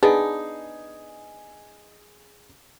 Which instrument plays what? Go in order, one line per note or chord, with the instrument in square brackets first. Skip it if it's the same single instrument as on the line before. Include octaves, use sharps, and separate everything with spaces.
[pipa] B3 D4 D#4 [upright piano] G#4